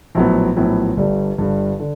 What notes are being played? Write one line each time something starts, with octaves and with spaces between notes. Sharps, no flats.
A#1 A2 F#3 B3
A#1 A2 F#3 B3
G1 G2 D3 G3
G1 G2 D3 G3
D3